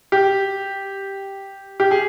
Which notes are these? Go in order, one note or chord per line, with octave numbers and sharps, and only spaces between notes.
G4
G4
G#4